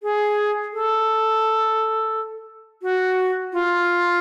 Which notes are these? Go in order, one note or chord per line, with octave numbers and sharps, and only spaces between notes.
G#4
A4
F#4
F4